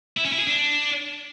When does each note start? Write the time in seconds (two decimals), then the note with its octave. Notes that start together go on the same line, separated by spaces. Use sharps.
0.17 E4
0.24 C#4
0.32 E4
0.40 G#4
0.47 D4